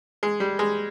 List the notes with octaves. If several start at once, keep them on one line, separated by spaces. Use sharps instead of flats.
G#3
G3
G#3